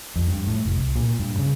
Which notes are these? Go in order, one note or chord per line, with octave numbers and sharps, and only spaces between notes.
F2
G2
A2
F1
C2
A#2
G2
C#3